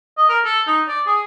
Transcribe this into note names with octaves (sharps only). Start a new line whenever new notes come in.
D#5
A#4
A4
D#4
D5
G#4